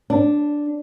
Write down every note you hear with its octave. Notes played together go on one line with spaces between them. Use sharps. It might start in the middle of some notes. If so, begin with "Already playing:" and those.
D4